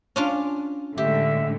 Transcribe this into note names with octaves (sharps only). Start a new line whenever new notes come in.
C#4 D4 F4
A2 D3 G#3 G4 E5